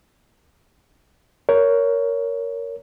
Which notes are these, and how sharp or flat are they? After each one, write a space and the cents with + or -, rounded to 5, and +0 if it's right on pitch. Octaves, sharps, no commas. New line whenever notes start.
A#4 +0 C#5 +15